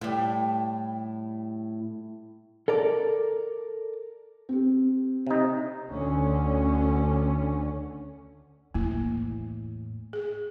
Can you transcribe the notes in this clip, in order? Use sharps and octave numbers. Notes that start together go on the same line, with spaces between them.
A2 G3
A4 A#4 D5
C4 G4
C3 D#4
D2 D3 C#4
E2 A2 A#3 E4
G#4